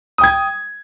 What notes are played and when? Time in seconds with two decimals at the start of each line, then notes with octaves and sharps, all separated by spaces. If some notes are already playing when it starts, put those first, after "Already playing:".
0.18 D#6
0.21 G5
0.24 G#6